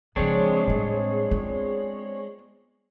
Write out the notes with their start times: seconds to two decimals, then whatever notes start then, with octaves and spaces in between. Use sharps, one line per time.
0.16 C#3 F3 G#3 C4 D4 G#4 C#5
0.67 A2 G3
1.31 B3 F4